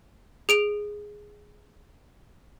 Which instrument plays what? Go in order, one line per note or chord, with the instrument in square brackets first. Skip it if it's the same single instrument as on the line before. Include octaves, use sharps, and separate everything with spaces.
[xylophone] G#4 D7 F7